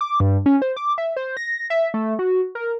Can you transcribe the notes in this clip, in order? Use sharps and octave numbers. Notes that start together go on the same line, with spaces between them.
D6
G2
C#4
C5
D6
E5
C5
A#6
E5
A3
F#4
A#4